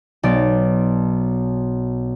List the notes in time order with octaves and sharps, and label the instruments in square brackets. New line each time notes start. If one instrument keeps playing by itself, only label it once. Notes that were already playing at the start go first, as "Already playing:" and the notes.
[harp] B1 D5